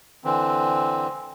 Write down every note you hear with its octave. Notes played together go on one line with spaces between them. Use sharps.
D3 E3 C4